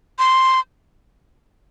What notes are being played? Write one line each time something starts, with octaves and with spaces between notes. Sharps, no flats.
C6